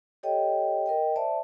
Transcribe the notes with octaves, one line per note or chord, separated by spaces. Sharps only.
G4 A4 C#5 D#5 G5
A#4 D#5 G5
C5 D5 E5 A5